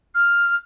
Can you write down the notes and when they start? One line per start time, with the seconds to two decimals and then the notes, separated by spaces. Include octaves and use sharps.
0.15 F6